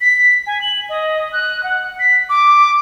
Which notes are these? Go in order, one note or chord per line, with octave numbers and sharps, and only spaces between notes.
B6
G#5
F#7
D#5
F#6
F#5
B6
D6